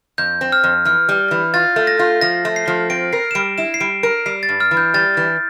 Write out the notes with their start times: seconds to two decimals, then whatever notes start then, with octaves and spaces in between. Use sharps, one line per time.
0.18 F2 G6
0.41 C4
0.52 F6
0.64 F2
0.85 E3 F6
1.09 G3
1.31 E3
1.54 F4 A6
1.76 A3
1.87 A#6
1.99 F4
2.21 F3 A#6
2.45 A3
2.56 C7
2.68 F3
2.90 C4 D7
3.13 A#4 C7
3.31 E7
3.35 G3 D7
3.58 E4 E7
3.74 C7
3.80 G3 D7
4.03 A#4 D7
4.26 G3 C7
4.43 A6
4.49 G2
4.60 F6
4.71 E3
4.77 G6
4.94 G3 A6
5.17 E3